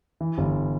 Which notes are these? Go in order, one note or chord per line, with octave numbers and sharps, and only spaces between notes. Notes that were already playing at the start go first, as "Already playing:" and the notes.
E3
G1